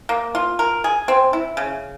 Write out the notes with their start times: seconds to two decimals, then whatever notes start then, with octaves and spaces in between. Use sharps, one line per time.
0.09 A#3
0.35 F4
0.59 A#4
0.84 G#4
1.08 C4
1.33 E4
1.57 C#3